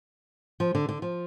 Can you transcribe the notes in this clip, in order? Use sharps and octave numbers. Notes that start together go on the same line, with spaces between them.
F3
D3
D3
F3